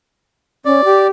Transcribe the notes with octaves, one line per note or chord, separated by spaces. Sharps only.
C#4 D5
G4